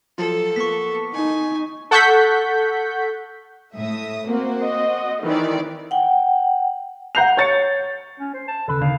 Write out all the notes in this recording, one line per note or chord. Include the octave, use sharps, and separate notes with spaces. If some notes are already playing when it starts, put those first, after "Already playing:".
F3 F#3 F4 A4
A#3 B3 C#6 B6
D#4 G#5
A4 F#5 C#6 G6 B6
A2 E5 D#6
A#3 C4 F#4 C5
D#5
D#3 E3 G4 C5 D5
F#5 G5
F#5 A#5 G6 C7 F7
C#5 A6 C#7
C#4
C5
A5
D#2 C#3 A4 B4
B2 D3 D#3 F5